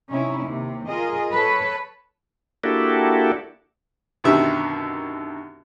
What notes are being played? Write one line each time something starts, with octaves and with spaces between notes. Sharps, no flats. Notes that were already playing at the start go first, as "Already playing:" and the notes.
C3 C#4 D#4 E4
D#2 C3
F4 G#4 A#4 D#5
A4 B4 C#5
A#3 D4 E4 F#4 G4 A4
F#2 B2 D3 D#3 G4 E5